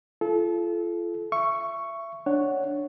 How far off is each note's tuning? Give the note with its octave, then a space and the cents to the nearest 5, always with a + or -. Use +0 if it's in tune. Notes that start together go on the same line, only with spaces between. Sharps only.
F4 -30 A4 -30
E5 +30 C#6 +0
D4 +0 C#5 +0 F#5 +5